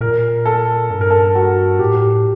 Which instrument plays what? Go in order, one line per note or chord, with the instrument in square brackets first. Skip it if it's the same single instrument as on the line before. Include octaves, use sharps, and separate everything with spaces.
[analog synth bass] A#2 [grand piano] A#4
[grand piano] A4
[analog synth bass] G2 [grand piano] A4
[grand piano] A#4
A4
F#4
[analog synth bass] A2 [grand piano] G4